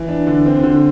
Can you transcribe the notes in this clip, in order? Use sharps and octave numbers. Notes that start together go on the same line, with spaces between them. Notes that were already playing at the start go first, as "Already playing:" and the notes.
Already playing: E3
D4
D3
C4
D3